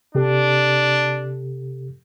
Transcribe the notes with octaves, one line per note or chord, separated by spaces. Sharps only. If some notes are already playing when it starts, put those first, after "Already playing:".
C3 D4 G4 A4